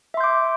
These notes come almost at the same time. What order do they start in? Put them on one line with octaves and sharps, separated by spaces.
E5 C6 G6 D6